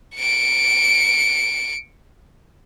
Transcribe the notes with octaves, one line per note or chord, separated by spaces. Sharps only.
C#7 D7